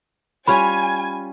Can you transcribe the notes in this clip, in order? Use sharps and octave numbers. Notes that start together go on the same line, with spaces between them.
G3 C#4 F4 G#5 B5